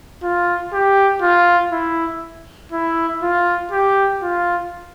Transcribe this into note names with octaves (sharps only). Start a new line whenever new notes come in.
F4
G4
F4
E4
E4
F4
G4
F4